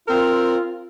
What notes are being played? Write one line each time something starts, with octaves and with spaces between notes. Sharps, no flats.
C4 F4 A#4